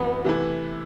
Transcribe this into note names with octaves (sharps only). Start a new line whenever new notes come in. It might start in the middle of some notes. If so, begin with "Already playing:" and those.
Already playing: F#2 E3 A3 B3 C4 F#4
C3 E3 A3 E4 B4